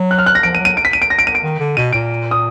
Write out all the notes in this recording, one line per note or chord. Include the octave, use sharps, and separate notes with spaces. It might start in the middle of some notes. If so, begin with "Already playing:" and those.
Already playing: F#3
F#6
F6
F#6
A#6
F3 D7
D#7
F#3
D#7
D7
B6
D#7
D7
A#6
D7
D#7
D7
D#3
D3
B2 D#7
A#2 D7
D#6